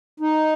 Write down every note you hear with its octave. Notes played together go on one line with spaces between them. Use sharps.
D#4